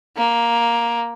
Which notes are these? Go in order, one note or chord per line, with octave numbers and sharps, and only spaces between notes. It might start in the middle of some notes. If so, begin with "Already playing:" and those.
A#3